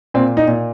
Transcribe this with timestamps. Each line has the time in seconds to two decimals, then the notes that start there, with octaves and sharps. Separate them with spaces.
0.14 A#2 C4
0.37 D#4
0.48 A#2